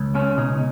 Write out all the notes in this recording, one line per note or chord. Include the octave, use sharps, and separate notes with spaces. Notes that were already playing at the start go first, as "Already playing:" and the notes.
Already playing: C#2
C#3 C#4
B2 D#4